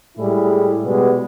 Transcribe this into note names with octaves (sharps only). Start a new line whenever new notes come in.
A2 G3 G#3 E4 G#4
B2 G3 G#3 B3